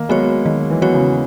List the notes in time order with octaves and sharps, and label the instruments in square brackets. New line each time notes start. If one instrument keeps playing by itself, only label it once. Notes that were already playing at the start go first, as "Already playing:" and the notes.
Already playing: [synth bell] D#3 [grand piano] A#3
[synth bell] F#3 B3 F#4 C#5 [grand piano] G#3
[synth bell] D#3 [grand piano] F#3
[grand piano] E3
[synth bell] F#3 B3 F#4 C#5
[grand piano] C#3